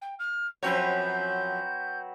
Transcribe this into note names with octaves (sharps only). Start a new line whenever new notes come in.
G5
F6
F#2 F3 F#3 C4 B4 C#5 G6